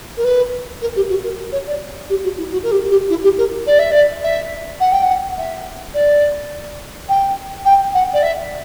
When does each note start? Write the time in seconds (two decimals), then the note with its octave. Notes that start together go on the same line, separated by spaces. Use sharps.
0.17 A#4
0.24 B4
0.81 A#4
0.96 G4
1.09 F#4
1.24 A#4
1.52 C#5
1.67 D5
2.09 G4
2.23 F#4
2.37 E4
2.52 F#4
2.63 A#4
2.71 G4
2.90 G4
3.10 E4
3.24 G4
3.38 A#4
3.66 D5
3.79 E5
3.91 D5
4.23 E5
4.80 F#5
4.92 G5
5.03 F#5
5.37 E5
5.94 D5
7.09 G5
7.65 G5
7.94 F#5
8.13 D5
8.22 E5